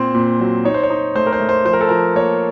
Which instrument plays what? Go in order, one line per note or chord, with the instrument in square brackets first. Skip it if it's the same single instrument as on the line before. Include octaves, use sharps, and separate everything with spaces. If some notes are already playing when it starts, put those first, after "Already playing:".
Already playing: [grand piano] A#2 C4 C5
A#2
F#3
D#4 C#5
C5
C#5
D#4
A3 C5
A#4
C5
A3
C5
F3 C5
A#4
A4
F3 A#4
A#3 C#5